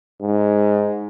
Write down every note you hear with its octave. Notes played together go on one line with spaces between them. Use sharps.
G#2